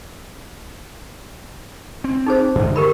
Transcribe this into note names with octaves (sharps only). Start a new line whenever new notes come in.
C4
D#4 G#4 C5
F#2 D3 D#3
G4 A#4 B5